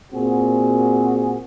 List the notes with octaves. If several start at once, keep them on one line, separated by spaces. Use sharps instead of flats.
A#2 C4 F#4 G#4